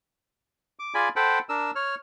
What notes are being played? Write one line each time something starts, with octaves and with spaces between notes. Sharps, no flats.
D6
F4 G#4 D5 G#5 B5
A4 C5 F#5 G5 B5
D4 A#4 E6
C#5 F6